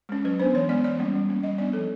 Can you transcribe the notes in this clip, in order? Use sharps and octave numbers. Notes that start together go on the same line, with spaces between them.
G#3 C#4
F#3 B4
B3 D4 C5
E3 C#5
G#3 B3 D5
E3 D5
G3 A#3 C#4
G3
A#3 C#4
G3 D#5
B3 D4 D5
F3 A4